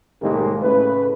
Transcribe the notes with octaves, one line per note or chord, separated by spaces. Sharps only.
C2 A2 D#3 G#3 A#3 G4
A2 C#3 A3 B4